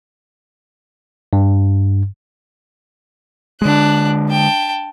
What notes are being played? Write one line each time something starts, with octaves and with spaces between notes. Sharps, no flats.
G2
D3 G#3 D4 F#6
G5 A5